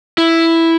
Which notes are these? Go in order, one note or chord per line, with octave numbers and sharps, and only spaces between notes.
E4